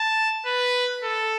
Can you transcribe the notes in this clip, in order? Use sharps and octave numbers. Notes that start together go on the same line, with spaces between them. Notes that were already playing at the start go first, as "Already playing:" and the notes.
Already playing: A5
B4
A4